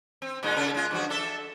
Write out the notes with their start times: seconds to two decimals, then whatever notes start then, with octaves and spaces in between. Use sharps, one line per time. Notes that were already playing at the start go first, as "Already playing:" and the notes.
0.22 C4
0.43 A#2 G#3 D#4
0.57 C#3 A#4
0.75 G#3 F4
0.91 G2 F3 F#4
1.10 D4 A4 E5